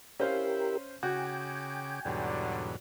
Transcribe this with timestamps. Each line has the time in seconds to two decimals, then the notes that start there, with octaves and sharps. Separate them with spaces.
0.20 C#4 E4 G4 A#4 C5 F5
1.03 C#3 F#4 G5 G#5 D6
2.05 E2 G#2 B2 D3 F#3 G3